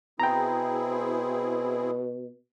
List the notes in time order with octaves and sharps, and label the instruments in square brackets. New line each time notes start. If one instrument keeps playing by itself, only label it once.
[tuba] B2 [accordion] C4 E4 G#4 [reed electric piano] G5 A#5